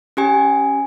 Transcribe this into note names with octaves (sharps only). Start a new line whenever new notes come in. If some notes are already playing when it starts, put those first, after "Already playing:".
C#4 G4 G#5